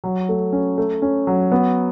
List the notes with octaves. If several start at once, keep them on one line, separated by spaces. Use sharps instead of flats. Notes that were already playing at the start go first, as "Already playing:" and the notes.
F#3
A3
C#4
A3
C#4
F#3
B3